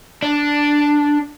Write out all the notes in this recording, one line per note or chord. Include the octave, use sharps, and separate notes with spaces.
D4